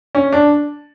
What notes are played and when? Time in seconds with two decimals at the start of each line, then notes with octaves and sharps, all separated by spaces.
0.15 C#4
0.33 D4